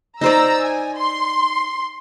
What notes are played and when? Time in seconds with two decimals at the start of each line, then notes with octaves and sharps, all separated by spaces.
0.21 D#4 C5 D5 A#5 E6
0.64 G#5
0.97 C6